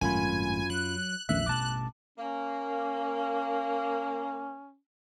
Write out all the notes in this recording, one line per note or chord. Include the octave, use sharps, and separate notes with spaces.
G#1 F#2 A2 A3 F4 G#5 B5
F#3 F#6
A#1 E2 D#3 A3 C#4 E5 F#6
A1 G2 B2 A5 D6
A#3 C#4